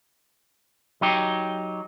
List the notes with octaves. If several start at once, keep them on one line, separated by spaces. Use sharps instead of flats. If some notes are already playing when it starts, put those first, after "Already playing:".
F#3 D#4 G4